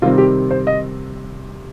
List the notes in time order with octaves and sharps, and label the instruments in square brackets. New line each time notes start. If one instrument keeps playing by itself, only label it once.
[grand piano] C3 D#3 G3 C4 F4
G4
C5
D#5